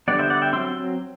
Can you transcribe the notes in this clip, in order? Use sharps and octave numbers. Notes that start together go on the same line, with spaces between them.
D3 G3 B3 D5 F#5
C5 E5
D5 F#5
E5 G5
F#3 C4 C6 E6